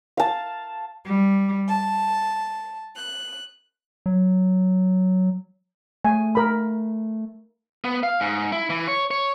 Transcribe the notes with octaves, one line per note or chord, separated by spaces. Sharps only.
F5 A5
G3
A5
F#6
F#3
A3 G#5
A#4 B5
B3
F5
G#2
E4
E3
C#5
C#5